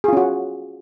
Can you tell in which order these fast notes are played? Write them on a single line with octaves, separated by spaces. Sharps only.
G#4 F4 C#4 F#4